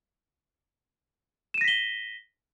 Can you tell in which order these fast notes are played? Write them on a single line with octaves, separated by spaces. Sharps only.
E7 D#7 A#6 B6 G7